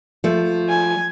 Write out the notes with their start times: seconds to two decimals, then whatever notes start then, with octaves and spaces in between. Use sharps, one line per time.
0.24 F3 A3
0.69 G#5